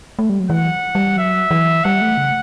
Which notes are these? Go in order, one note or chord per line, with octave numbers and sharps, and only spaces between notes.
A3
G3
F#3
E3 F#5
G3
F#3 E5
E3
G3 F#5
A3
C#3